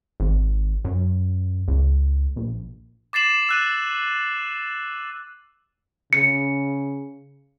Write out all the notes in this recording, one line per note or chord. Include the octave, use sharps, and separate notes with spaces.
G#1
F#2
C#2
A#1
D6 A6 C7 E7 F#7
E6 F#6 D#7
C#3 C#7